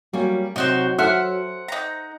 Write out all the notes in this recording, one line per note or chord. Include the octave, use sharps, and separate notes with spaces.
F#3 G3 A#3 C#4
C3 F#3 D#4 F#4 C5
A4 C5 E5 F#5 F6
D#4 A#5